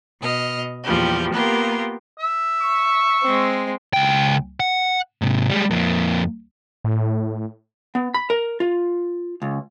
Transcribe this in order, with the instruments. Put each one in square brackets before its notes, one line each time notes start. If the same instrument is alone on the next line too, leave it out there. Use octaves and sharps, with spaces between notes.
[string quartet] B2 D#5 F6
E2 A#2 F3 G3 G4
A#3 B3 F4 G4 A#4
[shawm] E5
[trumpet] C#6
[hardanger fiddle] G#3 C4
[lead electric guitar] C#2 G5
F#5
G#2 C3
G3 G#3
F2 A#3
[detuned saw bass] A2
[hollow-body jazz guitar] B3
B5
A#4
F4
C#2